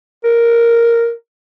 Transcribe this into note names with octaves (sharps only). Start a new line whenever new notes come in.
A#4